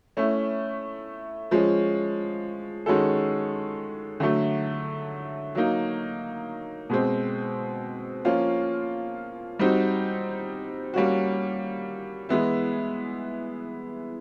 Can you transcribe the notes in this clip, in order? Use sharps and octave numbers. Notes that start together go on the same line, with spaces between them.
A3 C#4 E4
F3 G#3 C#4
D#3 G#3 C#4 F#4 A4
D3 F#3 A3
F#3 A#3 D#4
B2 G#3 C4
F3 A#3 C#4 F4
G3 C4 D#4 F#4
G3 A#3 C#4 F#4
E3 G#3 B3 E4